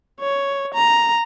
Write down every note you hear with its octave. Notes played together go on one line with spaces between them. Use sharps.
C#5
A#5